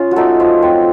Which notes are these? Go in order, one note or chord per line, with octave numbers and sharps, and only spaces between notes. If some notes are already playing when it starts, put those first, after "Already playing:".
Already playing: C#4 F4
F#4
A3 D#4 A4
F3
C4